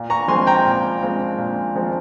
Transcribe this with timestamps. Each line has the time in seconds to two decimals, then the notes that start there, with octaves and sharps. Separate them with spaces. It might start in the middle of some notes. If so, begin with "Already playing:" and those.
Already playing: A#2
0.10 A#5 C#6
0.28 F3 G#3 C4 G#5 C6
0.47 G5 A#5
0.65 A#2
1.03 F3 G#3 C4
1.38 A#2
1.75 F3 G#3 C4